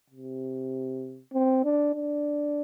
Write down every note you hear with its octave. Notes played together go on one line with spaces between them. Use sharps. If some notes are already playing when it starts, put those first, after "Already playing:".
C3
C4
D4
D4